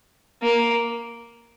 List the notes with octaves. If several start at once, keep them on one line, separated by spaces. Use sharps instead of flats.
A#3